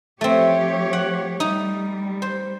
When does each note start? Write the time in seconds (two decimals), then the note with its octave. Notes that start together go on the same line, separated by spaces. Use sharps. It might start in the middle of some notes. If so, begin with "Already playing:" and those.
0.21 F3 A3 C4 G4 C#5
0.93 F#5
1.40 G3 D#4
2.22 C5